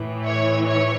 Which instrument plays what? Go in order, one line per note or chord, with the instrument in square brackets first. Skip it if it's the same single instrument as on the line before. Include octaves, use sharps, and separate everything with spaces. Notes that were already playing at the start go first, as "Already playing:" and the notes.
Already playing: [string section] A2 E3
C#5
C#5